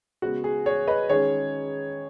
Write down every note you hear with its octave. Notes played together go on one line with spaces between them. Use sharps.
C#3 G#3 B3 F#4
G#4
G#4 C#5
B4 D#5
D#3 G#3 C#4 G#4 C#5